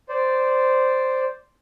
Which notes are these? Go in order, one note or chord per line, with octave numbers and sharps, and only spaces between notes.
C5 D5